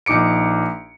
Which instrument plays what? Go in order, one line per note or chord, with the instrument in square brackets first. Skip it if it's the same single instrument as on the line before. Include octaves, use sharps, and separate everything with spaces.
[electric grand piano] A#1 D#4 D6 C#7 D7